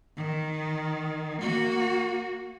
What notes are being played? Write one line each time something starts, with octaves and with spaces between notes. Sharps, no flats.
D#3
A#3 F#4